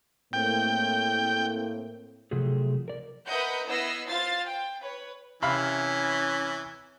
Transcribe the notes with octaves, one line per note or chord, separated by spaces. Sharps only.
A2 A#3 C4 G5
C3 F3 F#3 A3 F#4 G#4
A#4 D5
A#4 B4 D#5 E5 F#5 G6
B3 E4 D#5 E6 A#6 C7
F4 C5 F5 A6 C7
G5
B4 C#5
C3 E3 C#4 F5 B5